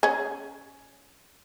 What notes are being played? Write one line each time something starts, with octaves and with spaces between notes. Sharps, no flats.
C#4 G#4